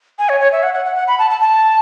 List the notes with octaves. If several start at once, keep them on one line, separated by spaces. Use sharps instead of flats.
G#5
C#5
C#5
E5
F#5
F#5
F#5
F#5
B5
A5
A5
A5